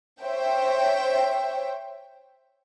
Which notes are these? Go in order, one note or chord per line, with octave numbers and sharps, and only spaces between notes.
C5 C#5 E5 G5